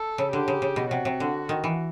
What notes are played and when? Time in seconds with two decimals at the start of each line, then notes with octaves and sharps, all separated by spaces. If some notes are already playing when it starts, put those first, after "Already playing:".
Already playing: A4
0.18 C#3
0.32 D3 G4
0.48 C#3
0.62 C#3
0.76 B2
0.91 C3 F#4
1.05 C3
1.20 D3
1.49 D#3
1.64 E3